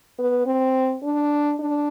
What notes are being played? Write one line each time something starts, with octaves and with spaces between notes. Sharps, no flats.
B3
C4
D4
D4